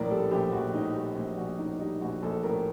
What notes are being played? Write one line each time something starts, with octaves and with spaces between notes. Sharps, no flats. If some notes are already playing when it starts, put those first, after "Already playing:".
Already playing: A#1 A2 A#4 D5
G3 A4
A#1 G4
A#1 F#4
A2 D#4
G3 F#4
A#1
A#1 F#4
A2 D#4
G3 D#4
A#1 F#4
A#1 A4
A2 A#4